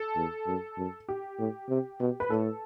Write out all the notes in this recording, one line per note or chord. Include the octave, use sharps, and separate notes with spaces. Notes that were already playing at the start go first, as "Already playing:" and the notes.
Already playing: A4
E2
F#2
F#2
G4
A2
C3
B2
B4
A2 A4